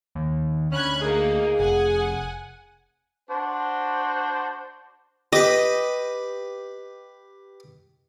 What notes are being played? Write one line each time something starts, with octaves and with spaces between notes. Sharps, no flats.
D#2
D2 C#4 B5 F#6 G#6
A#3 D#4 G#4
F1 F#5 G#5
D4 F#4 C5
G4 B4 D#5